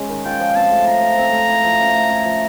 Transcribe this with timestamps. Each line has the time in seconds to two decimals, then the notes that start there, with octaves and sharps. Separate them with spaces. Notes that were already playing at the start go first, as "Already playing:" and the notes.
Already playing: G#3 C#4
0.09 D#3
0.25 F4 G5
0.40 F3
0.56 C4 A5
0.71 A3
0.87 F4 A#5
1.02 F3
1.18 C4
1.32 A3
1.49 E4
1.64 F3
1.80 C#4
1.95 A3
2.11 E4
2.25 F3